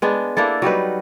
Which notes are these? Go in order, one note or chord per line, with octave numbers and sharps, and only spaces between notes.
G#3 B3 D4
A#3 D4 E4 A4
F#3 G3 D#4 B4